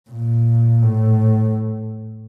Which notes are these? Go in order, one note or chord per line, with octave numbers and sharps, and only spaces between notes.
A#2
A2